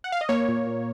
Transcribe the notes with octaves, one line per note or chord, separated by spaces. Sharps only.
F#5
F5
D#5
A#3 C#5
A#2
A#2